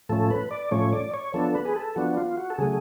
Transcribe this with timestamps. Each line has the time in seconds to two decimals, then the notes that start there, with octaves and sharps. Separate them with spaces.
0.09 A2 F3 A3 C#4 A4
0.30 B4
0.51 D5
0.71 A2 F3 A3 C#4 C#5
0.93 D5
1.14 C#5
1.34 F3 B3 D4 A4
1.55 B4
1.65 G#4
1.76 A4
1.96 F3 B3 D4 F#4
2.17 F4
2.37 F#4
2.50 A4
2.58 C#3 F#3 A3 G#4